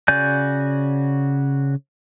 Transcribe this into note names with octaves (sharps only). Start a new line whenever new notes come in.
C#3 F#4 D5 G#5 G6